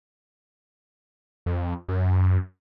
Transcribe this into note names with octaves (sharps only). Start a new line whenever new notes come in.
F2
F#2